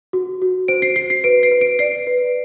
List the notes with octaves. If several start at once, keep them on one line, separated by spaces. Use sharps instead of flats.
F#4
F#4
C5 D7
C7
F#4 C7
C7
B4 D7
C7
B4
D7
D5 C7
B4